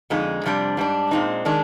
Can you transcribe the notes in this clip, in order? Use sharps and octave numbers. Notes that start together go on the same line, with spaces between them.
F2 D3 G#3 D#4
F2 C3 G3 D4
G#2 G3 D4
A#2 G#3 C4 D#4
D#3 G#3 D4